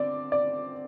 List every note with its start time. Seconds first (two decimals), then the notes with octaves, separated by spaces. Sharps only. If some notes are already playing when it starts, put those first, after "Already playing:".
Already playing: D3 C4 D5
0.32 D5